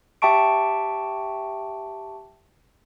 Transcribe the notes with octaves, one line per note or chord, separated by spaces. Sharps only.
G4 E5 G5 A5 C#6 D7